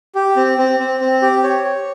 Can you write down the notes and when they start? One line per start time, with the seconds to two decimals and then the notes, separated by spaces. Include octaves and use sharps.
0.15 G4
0.36 C4
0.58 C4
0.79 C4
1.01 C4
1.22 G4
1.44 C#5
1.65 C#5